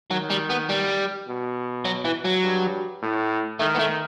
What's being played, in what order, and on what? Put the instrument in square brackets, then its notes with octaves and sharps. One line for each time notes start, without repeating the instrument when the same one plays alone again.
[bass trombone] D#3 [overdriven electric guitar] F#3
[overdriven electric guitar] G3
B3
G3
[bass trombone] B2
[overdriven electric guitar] F#3
E3
F#3
[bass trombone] G2
A2
[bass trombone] D#3 [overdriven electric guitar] A3
[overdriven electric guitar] B3
A3